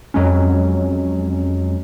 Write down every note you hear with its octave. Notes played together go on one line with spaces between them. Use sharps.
F2 F#3 G#3 C#4